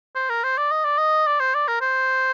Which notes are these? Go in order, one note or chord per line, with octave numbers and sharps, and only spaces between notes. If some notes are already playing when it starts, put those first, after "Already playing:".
C5
A#4
C5
D5
D#5
D5
D#5
D5
C5
D5
A#4
C5